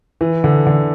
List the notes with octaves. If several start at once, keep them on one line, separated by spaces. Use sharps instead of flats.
E3
D3
D3